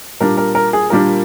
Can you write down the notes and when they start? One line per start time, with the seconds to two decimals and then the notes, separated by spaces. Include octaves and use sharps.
0.20 A#2 G3 D4 A#4
0.37 A#4
0.55 A#4
0.73 G#4
0.90 A#2 G3 D4 A#4